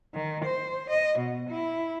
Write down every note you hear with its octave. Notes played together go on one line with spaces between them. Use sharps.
D#3
C5
D#5
B2
E4